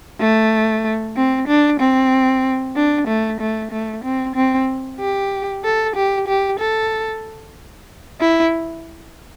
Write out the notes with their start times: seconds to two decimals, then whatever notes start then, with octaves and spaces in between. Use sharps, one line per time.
0.20 A3
1.16 C4
1.47 D4
1.79 C4
2.76 D4
3.07 A3
3.40 A3
3.71 A3
4.04 C4
4.35 C4
5.00 G4
5.64 A4
5.96 G4
6.27 G4
6.59 A4
8.20 E4